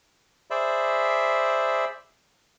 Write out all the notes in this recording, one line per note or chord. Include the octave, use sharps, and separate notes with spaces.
G#4 C5 D5 E5 B5